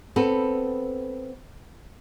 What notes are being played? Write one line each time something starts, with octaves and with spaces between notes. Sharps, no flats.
B3 C4 A4